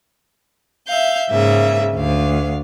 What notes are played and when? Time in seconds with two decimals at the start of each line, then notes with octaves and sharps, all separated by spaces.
0.88 E5 F5 G6
1.30 G#2 C#3 A#3 E5
1.96 D2 F5